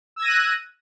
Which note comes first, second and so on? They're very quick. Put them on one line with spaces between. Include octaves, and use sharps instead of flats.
E6 G#6 A#6 D#7 F#6